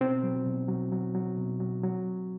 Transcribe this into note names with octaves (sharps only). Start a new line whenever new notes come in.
B2 C4
F#3
B2
F#3
F#3
F#3
B2
F#3
F#3